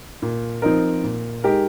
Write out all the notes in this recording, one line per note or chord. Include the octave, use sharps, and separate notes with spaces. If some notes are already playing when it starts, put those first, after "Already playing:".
A#2
F3 C4 D#4 A#4
A#2
G#3 D#4 G4 A#4